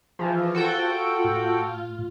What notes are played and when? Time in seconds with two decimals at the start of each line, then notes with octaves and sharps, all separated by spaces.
0.19 E3 F3 F4 G#4 C5
0.55 F#4 A4 G5
1.25 A2